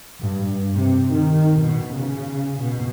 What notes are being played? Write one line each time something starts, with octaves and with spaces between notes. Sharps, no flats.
G2
C3
D#3
B2
C#3
B2